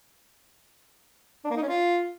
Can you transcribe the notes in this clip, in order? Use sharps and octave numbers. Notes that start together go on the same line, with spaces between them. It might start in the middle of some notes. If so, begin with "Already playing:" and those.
D4
A#3
D#4
C#4
F4